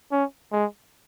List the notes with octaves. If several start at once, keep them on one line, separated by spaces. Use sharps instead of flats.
C#4
G#3